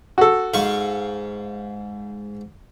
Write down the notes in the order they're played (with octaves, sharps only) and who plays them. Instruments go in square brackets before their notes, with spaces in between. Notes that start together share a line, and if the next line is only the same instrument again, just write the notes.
[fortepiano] F#4 A4
[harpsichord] G#2 F5 C#6